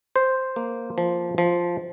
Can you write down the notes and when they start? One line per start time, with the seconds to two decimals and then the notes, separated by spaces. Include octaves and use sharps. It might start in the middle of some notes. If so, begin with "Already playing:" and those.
0.16 C5
0.56 A#3
0.98 F3
1.38 F3